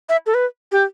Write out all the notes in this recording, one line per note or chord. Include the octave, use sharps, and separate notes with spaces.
E5
A4
B4
G4